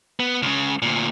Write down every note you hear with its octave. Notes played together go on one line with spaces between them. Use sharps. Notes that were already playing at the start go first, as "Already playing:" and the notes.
B3
C#2 C#3
D2 A#2